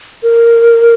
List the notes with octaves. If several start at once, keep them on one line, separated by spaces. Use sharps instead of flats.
A#4